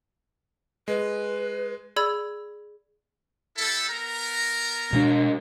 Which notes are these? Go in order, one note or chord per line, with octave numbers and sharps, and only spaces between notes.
G#3 B4
G#4 D5 B5 E6 G#6
G3 E4 A4
B3 A#4 A#5
B2 G#3 D4